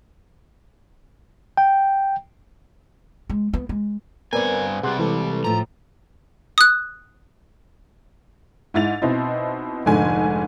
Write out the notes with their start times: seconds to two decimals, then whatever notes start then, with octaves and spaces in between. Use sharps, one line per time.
1.57 G5
3.30 G#3
3.53 B3
3.69 G#3
4.33 G2 B3 C4 A#4 B4 D5 G#5
4.83 C3 G3 G#4 F#5 C6 F#6
4.99 E3 G#3 A4 B4
5.44 A2 F3 A#5
6.58 D#6 F#6
8.74 G#2 E4 A6 F7
9.02 B2 C4 D#4 E4
9.86 F1 G#2 D3 G#5